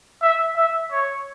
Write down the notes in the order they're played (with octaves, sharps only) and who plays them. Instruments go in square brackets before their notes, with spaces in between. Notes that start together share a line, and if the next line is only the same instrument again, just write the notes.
[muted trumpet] E5
E5
C#5